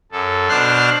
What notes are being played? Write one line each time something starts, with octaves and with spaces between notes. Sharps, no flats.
F#2 A4
B2 D4 C5 C6 F6 F#6